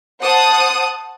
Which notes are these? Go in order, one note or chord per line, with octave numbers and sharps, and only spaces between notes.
C5 F#5 A5 D#6